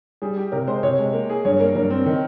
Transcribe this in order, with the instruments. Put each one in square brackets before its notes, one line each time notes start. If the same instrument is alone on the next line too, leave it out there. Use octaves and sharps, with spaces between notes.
[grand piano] G3 [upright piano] G#4
[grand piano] G4
[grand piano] C3 [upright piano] A#4
[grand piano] G#3 [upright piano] C5
[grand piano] C3 [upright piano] C#5
[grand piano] G#3
A#3
G#4
[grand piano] G2 [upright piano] C#5
[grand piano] A#3 [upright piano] A#4
[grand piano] G2 [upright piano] A#4
[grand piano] C4
D#3